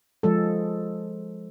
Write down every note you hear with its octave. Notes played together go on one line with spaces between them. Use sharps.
F3 G#3 A4